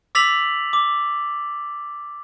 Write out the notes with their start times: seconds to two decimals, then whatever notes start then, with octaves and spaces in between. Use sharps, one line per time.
0.15 D6 E6 A6 B6 F7 F#7
0.73 D6